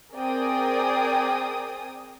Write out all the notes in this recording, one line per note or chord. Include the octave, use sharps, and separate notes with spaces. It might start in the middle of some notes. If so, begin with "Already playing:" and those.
C4 G#4 A#4 D5 G5 D#6